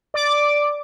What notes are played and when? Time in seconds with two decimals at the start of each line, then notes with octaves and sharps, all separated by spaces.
0.14 D5 D6